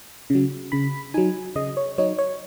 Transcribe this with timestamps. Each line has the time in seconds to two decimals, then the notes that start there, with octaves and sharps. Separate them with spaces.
0.30 C#3 F#3
0.72 C#3 B5
1.14 F#3 D#4 G#5
1.56 C#3 D#5
1.77 C#5
1.98 F#3 D#4 C#5
2.18 C#5